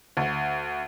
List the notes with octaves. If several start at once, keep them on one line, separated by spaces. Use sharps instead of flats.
D2